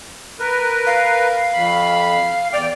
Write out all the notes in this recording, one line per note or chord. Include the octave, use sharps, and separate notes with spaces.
A#4 B4
F5
F2 B5
E2 D5 G5 F6